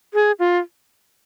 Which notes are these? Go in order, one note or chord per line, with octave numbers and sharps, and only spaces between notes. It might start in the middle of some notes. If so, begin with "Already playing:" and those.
G#4
F4